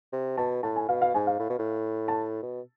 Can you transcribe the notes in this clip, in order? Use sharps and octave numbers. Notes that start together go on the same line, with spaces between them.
C3
B2 A5
A2 A5
G#5
B2 F5
F5
G#2 G#5
F5
A2
B2
A2
A5
B2